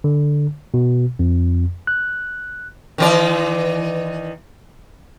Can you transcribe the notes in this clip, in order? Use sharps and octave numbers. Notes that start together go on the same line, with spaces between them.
D3
B2
F2
F#6
D#3 E3 D5